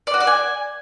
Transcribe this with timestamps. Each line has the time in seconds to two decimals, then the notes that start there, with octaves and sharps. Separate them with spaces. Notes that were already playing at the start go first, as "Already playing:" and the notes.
0.07 D5
0.14 F#4
0.20 D5
0.27 G#5